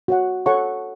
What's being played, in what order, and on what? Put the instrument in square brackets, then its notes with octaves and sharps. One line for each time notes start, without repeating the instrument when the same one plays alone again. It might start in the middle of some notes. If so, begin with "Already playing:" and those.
[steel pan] F#4 C#5 F#5
A4 C#5 F#5 A5 C#6